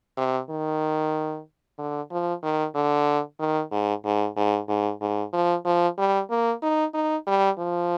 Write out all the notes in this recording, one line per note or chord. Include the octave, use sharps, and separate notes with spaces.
C3
D#3
D3
F3
D#3
D3
D#3
G#2
G#2
G#2
G#2
G#2
F3
F3
G3
A#3
D#4
D#4
G3
F3